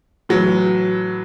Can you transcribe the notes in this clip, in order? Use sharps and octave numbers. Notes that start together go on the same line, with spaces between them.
A2 E3 F#3